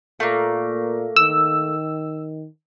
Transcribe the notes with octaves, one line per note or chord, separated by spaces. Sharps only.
A#2 A3 A#3
D#3 E6